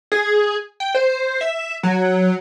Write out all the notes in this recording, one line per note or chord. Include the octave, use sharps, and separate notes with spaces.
G#4
G5
C5
E5
F#3